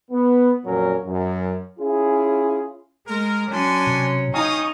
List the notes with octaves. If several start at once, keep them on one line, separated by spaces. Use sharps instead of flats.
B3
F2 A#2 F#3 C#4 A#4
F#2
C#4 E4 F4 G#4
G#3 A#4
F#3 C#4 D4 G#5 C6
C3
C#4 D#4 F5 G5 G#5 C#6 D#6